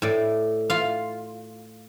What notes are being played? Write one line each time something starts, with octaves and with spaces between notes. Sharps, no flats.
A2 D5
F4 F5